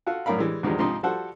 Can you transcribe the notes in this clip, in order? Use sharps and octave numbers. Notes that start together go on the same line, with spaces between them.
F4 F#4 A4 F#5
F#2 A2 D4 A#4 F5 B5
E3 G3 G#3
E2 D#3 F3 G3 G#3
G#2 C3 F3 D#4 C6
F3 G3 F#4 A4 C5 F#5